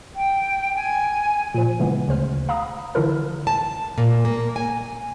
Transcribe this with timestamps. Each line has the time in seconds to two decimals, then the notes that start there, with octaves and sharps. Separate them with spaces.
0.16 G5
0.75 G#5
1.54 A#2 F3
1.80 C#3 E3 G#3 B3
2.08 D2 C#3 C5 F6
2.49 F5 A#5 B5 D#6
2.95 D3 E3 F3 E4 A4 A#4
3.47 A5
3.98 A#2
4.25 A#3
4.56 G#5